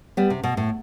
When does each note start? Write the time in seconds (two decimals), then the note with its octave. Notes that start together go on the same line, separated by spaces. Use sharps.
0.17 G3 B3
0.30 C3
0.43 B2
0.57 A2